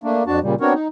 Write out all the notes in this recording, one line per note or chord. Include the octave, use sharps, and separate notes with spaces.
A3 A#3 D4
F2 D4 F#4 A5
A#2 C#3 G3
B3 C4 D4 F#4 A#4 C#5
D#4